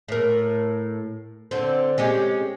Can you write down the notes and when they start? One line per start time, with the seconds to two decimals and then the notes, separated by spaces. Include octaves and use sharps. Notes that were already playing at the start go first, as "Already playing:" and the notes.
0.08 A2 A#4
1.51 D3 C4
1.98 G#3 C#4 G4